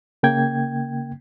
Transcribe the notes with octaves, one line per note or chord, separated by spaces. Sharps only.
C#3 A#3 G5 G#6